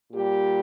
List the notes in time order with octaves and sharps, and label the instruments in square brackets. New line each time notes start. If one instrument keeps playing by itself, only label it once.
[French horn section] A#2 G3 G4